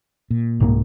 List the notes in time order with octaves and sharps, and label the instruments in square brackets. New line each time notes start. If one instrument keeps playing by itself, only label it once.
[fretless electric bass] A#2
[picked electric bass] C2 G#2 A#3